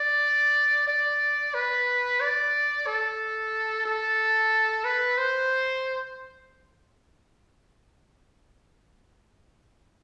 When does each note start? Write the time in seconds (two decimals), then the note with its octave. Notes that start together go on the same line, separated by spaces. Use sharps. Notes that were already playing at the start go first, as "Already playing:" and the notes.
Already playing: D5
0.88 D5
1.54 B4
2.21 D5
2.87 A4
3.86 A4
4.85 B4
5.18 C5